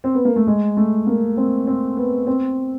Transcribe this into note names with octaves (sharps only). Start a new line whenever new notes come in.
C4
B3
A#3
A3
G#3
A3
A#3
C4
C4
B3
C4